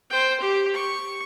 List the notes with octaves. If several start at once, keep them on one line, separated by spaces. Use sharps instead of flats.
C5 G5
G4
C#6